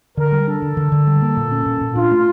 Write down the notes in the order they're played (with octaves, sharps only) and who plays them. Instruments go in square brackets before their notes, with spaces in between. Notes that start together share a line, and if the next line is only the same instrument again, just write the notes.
[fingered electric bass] D3 [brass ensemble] A#4
[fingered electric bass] G3
[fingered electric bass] D4 [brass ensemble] A4
[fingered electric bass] D3
D3
D3
G3
A#3
A#2
C#4
A#2
A#2
[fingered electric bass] D4 [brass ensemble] F4
[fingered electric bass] A3